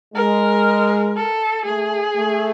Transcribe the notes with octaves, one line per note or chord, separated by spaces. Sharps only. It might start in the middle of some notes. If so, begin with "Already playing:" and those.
G#3 A#4
A4
A3 G#4
A3